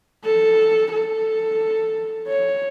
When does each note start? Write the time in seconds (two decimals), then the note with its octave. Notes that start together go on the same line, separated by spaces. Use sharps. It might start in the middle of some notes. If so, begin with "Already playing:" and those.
0.25 A4
0.92 A4
2.27 C#5